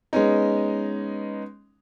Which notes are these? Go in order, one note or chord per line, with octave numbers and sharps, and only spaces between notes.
G#3 B3 C#4 D#4